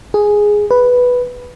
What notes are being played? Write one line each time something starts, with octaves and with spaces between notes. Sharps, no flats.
G#4
B4